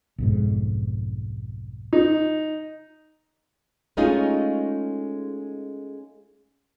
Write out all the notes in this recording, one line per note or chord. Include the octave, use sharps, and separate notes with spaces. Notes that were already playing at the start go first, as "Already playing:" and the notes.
B1 F2 G#2
D#4
G#3 A3 C#4 D#4 F4 G#4